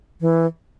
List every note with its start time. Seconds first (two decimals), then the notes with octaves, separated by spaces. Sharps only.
0.21 E3